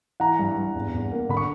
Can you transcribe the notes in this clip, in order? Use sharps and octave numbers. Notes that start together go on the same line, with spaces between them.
E3 F#5 A#5
G2
G2
E2
E2
A#3
D3 B5
C#6